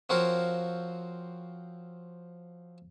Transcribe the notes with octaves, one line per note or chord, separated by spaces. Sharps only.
F3 C4 F#4 A#4 C#5 F5